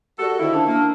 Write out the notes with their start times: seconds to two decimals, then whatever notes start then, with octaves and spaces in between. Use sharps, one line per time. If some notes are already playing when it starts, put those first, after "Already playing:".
0.19 F#4 G4 A4 A#4 D5
0.39 D3 D#3 E4 C5 F5
0.52 C#4 D4 A5
0.67 A#3